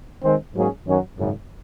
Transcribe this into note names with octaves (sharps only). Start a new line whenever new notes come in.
D#3 G#3 C4
G#2 F#3 A#3 C#4 G#4
F#2 D#3 F#3 C#4
G#1 F#2 C#3